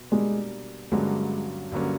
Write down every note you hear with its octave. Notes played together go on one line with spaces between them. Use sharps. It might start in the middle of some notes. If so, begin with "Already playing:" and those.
Already playing: B2
B2 G3 G#3 A#3 D4
G2 D3 F#3 G#3 A#3 C#4
G2 D3 F#3 A#3 C#4